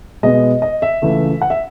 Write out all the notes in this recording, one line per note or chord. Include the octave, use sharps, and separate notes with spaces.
B2 G#3 B3 D#5
D#5
E5
C#2 C#3 E3 A3
F#5
E5